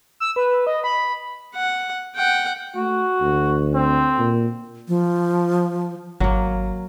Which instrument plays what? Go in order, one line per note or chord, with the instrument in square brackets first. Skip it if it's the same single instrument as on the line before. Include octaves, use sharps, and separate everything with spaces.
[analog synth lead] E6
B4
D#5
B5
[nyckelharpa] F#5
F#5 G5
[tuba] A3 [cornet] F#4
[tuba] D2
[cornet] C4
[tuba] A#2
[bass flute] F3
[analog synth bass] G#1 [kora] F#3 A#3